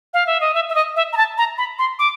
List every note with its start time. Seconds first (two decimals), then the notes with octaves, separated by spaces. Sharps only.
0.14 F5
0.27 E5
0.41 D#5
0.54 E5
0.69 E5
0.75 D#5
0.96 E5
1.13 A#5
1.17 A5
1.38 A#5
1.58 B5
1.79 C6
1.99 D6